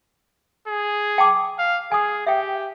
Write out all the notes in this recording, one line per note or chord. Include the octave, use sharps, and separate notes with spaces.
G#4
G5 A5 D6
F5
G#4 G#5 D#6
G4 E5 G5